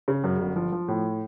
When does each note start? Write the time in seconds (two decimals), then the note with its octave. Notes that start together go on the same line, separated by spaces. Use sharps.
0.08 C#3
0.24 F#2
0.40 G1
0.56 F3
0.72 F3
0.88 A2